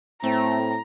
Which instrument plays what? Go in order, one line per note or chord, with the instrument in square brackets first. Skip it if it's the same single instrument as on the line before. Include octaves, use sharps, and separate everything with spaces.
[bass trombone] A2 [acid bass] A3 [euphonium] C4 [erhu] A#5